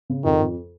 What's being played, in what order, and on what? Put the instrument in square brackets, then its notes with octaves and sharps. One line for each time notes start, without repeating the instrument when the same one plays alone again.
[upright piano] C#3
[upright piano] F2 [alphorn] D#3
[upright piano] F2